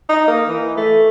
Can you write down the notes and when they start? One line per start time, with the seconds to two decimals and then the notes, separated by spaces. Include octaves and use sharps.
0.09 D#4
0.28 A#3
0.48 E3
0.77 A3